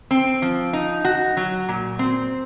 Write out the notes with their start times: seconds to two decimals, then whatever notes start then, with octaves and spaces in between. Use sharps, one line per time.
0.11 C4
0.42 F3
0.73 D#4
1.05 F#4
1.37 F#3
1.68 A#2
1.99 C4